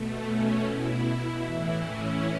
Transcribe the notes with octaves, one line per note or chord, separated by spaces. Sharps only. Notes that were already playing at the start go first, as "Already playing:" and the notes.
Already playing: B2 A3
C#4
B2 E4
A2 E3 E4
C#4